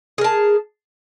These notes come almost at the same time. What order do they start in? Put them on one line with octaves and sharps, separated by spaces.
G#4 A#4 A5